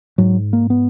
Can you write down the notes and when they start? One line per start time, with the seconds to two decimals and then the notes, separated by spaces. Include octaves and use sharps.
0.18 G#2 F#3
0.53 A#3
0.70 B3